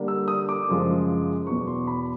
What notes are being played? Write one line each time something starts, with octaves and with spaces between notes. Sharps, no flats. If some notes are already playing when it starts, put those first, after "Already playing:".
Already playing: D3 G3 A#3 D4
E6
D#6
D6
F#2 C#3 F3 G#3
E2 B2 F#3 C#6
C6
B5